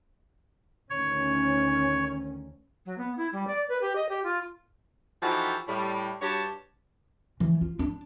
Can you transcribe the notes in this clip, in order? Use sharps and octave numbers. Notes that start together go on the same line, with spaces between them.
D2 D#3 C#4 C#5
F#3
B3
E4
G3
D5
B4
G4
D#5
G4
F4
E3 F3 D#4 F#4 G4 A4
A2 G3
G2 F#4 G4 C#5 A5
E3
F4
D4